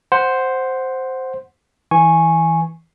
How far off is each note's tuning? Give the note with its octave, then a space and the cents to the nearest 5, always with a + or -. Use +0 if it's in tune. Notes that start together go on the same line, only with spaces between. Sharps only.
C5 +0 F#5 +0
E3 -15 G#5 +0 C#6 -15